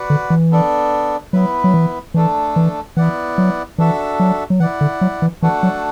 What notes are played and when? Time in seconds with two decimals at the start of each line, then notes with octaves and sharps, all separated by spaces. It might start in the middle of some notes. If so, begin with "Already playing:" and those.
Already playing: F#4 B4 D5 F#5
0.10 D3
0.30 E3
0.51 B3 D4 A4 D5
1.33 F#3 B3 E4 B4
1.64 F#3
1.74 E3
2.14 E3 A3 D4 A4
2.56 E3
2.97 E3 B3 E4 D5 F#5
3.38 F#3
3.78 E3 D4 F#4 A4 E5
4.20 F#3
4.50 F#3
4.60 E3 E4 D5 F#5
4.81 D3
5.01 F#3
5.22 E3
5.42 E3 A3 D4 F#4 A4 F#5
5.63 F#3